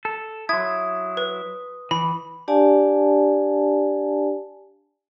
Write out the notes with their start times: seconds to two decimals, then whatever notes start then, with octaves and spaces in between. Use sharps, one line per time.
0.05 A4
0.49 F#3 E4 C6 D#6 G#6
1.17 B4
1.91 E3 B5
2.48 D4 G4 D5 F5 G#5 A5